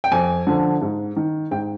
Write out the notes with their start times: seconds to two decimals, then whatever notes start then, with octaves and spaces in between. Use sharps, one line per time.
0.04 G5
0.12 F2 G#5
0.47 D3 F3
0.82 G#2
1.16 D#3
1.51 G#2 G5